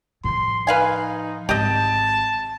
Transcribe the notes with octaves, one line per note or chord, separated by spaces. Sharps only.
A2 F3 C6
D#4 B4 F5 G#5
G#1 G4 D#5 A5